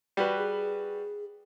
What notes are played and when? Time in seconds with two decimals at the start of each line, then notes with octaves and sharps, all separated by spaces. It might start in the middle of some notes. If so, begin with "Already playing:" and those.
0.17 G3 F#4 B4
0.37 G#4